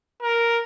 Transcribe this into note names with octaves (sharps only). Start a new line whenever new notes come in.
A#4